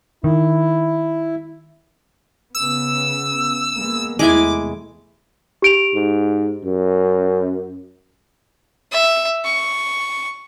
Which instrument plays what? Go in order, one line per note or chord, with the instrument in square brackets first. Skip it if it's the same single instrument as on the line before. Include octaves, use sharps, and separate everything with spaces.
[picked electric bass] D#3 [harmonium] E4
[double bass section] C#3 B3 [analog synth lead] E6
[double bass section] G#3 A#3 B3
[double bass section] E2 C3 A3 [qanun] G#3 E4 G#5 [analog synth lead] D6
[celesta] G4 D7 F7
[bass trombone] G#2
F#2
[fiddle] E5
C#6